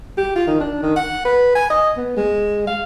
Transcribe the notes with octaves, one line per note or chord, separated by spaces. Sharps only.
G4
F4
D#3
D4
D#3
F#5
B4
G#5
D#5
B3
G#3
F5